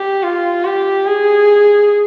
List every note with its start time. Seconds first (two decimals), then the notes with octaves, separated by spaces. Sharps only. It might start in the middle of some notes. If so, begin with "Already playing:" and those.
Already playing: G4
0.22 F4
0.65 G4
1.06 G#4